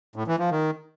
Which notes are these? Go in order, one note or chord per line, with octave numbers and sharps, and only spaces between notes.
A2
E3
F3
D#3